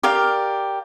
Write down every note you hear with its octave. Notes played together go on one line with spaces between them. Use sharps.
G4 A#4 D5 F5